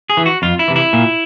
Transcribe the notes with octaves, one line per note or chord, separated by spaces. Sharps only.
G#4
E3
F#4
F2 F4
E4
C3 E3
E4
A#2